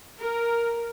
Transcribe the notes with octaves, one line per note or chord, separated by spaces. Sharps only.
A#4